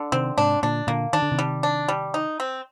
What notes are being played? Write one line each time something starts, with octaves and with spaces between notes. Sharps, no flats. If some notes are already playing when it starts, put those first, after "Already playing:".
Already playing: D3
C3 D#3 C4
G#2 C3 D4
A#2 D3 D4
A#2 D3 A#3
D#3 D4
D3
C3 D#3
G3
D4
G3
D#4
C4